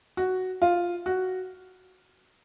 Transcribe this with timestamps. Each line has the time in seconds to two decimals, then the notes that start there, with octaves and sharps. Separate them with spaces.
0.17 F#4
0.62 F4
1.06 F#4